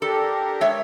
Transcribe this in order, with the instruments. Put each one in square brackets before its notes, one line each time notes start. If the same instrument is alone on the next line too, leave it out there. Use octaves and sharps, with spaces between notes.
[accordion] D4 G4 A#4 [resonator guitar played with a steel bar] A4
[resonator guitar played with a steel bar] G#3 C#5 E5